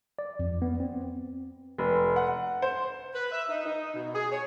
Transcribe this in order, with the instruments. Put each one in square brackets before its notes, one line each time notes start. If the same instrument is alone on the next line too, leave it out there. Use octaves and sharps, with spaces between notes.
[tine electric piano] D5
F2
B3
C4
[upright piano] F1
F#5
C5
[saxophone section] B4
E5
D#4
D#4
B2
G#4
C#5